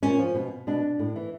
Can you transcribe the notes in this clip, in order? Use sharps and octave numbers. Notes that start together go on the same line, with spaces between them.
A#2 C#4
F3
B2
B2 D4
A2
E3